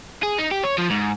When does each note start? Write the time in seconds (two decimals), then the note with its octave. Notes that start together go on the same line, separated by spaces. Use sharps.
0.23 G#4
0.38 D#4
0.51 G4
0.64 C#5
0.78 F3
0.90 G#2